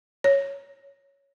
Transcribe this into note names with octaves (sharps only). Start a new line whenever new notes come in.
C#5